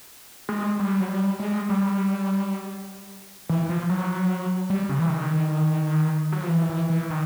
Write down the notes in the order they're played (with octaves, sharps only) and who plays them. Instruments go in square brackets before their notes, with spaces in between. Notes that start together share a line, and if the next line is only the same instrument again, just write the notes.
[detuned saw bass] G#3
G3
F#3
G3
G#3
G3
E3
F3
F#3
G3
C#3
E3
D#3
F#3
F3
E3
E3
E3
D#3